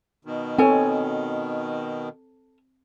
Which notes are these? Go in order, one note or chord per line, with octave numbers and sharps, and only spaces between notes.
B2 D#3
C4 A4 C#5 G#5